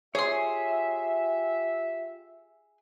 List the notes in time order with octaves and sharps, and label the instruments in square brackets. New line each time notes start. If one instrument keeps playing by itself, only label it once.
[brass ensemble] F4 G4 E5 [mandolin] G#4 C6 [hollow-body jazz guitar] C#5